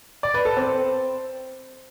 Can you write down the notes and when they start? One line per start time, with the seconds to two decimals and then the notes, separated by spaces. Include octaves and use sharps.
0.23 D5
0.34 B4
0.45 A4
0.57 C4